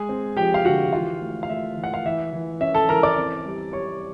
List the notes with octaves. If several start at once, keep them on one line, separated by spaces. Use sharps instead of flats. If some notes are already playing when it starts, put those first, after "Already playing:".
Already playing: G#3 G#4 G#5
C4
F3 G4 G5
F5
D3 F#4 F#5
E3 F4 F5
A3
F5
A3 E5
E3
F#5
F5
E3 E5
E3
C#4 E5
A4 A5
E3 A#4 A#5
D5 D6
C4
G3
G3 C#5 C#6